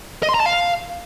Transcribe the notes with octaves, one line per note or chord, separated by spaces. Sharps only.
D#5
C6
A#5
A5
F5